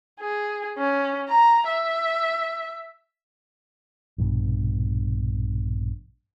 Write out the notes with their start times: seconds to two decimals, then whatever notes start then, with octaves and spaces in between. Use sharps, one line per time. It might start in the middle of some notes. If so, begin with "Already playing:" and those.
0.20 G#4
0.78 C#4
1.29 A#5
1.68 E5
4.18 A#1 G2 B2